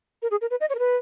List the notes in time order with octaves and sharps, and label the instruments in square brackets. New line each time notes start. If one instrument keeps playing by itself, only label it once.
[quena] A#4
G#4
A#4
B4
D#5
C#5
A#4
B4